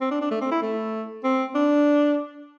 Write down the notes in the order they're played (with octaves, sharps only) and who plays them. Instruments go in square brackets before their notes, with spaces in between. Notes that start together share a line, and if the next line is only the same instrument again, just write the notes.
[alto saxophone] C4
D4
D4
A3
C4
E4
A3
C4
D4